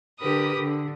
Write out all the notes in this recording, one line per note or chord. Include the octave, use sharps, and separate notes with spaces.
D3 G4 A#4 B4 D#6
D3